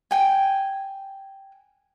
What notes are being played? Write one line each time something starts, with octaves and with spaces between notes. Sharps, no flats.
G5 G#5